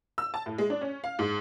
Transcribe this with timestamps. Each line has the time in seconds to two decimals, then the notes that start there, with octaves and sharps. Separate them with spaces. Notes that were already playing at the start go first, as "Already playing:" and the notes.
0.18 E6
0.34 A5
0.46 A2
0.58 G#3
0.70 D4
0.81 C#4
1.04 F5
1.19 G#2